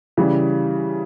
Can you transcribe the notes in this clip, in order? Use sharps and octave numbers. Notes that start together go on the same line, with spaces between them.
C#3 E3 G3